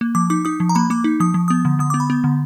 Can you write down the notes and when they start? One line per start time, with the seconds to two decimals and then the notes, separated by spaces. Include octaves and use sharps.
0.01 A#3
0.15 F3 D6
0.30 D#4 D6
0.45 D#4 D#6
0.60 F3
0.69 A#5
0.75 A#3 B5
0.90 A#3 D6
1.04 D#4
1.20 F3 D#6
1.34 F3
1.48 B3 D#6
1.65 D3
1.79 D3 D#6
1.90 D6
1.94 B3
2.00 B5
2.10 B3
2.24 D3